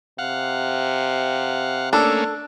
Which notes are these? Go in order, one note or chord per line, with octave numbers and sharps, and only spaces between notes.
C3 F5 F#5
A3 A#3 C#4 D4 A4